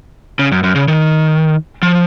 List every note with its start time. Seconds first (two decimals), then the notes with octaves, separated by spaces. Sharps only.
0.39 C#3
0.52 F#2
0.63 F#2
0.75 C#3
0.88 D#3
1.83 F3